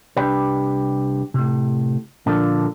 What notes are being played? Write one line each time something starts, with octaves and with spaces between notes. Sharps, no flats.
C2 D4 G4 B4
A2 C3
A#2 D3 F3 A#3 D4 A4